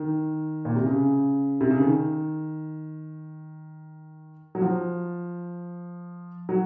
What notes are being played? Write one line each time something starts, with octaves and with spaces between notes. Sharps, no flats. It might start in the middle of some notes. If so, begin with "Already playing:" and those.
Already playing: D#3
A#2
C3
C#3
C3
C#3
D#3
F#3
F3
F#3